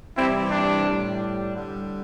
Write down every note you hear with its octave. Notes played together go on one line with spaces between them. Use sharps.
C3 E3 G3 C4 E4
D4
A2 G3
D3 G3